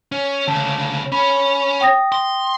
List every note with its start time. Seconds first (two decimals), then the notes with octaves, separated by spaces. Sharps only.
0.12 C#4
0.48 D2 C#3 A5
1.12 C#4 B5
1.81 G5 D#6 A#6
2.12 C6